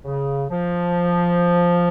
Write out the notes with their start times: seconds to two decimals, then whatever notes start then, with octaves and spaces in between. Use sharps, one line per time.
0.04 C#3
0.50 F3